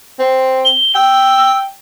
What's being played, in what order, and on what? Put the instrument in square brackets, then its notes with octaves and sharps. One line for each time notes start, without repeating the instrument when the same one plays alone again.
[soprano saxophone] C4
[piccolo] G7
[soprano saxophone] G5 [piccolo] E6